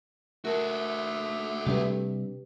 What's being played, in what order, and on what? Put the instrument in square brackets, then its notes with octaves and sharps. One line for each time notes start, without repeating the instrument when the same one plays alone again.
[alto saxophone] A3 [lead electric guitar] F#4 A4 [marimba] A#4
[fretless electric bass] C3 G3 D4 [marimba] G4 B4